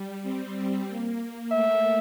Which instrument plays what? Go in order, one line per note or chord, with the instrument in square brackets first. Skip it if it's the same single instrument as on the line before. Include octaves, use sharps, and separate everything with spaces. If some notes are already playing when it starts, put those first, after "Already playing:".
Already playing: [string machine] G3
C4
A#3
[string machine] A3 [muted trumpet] E5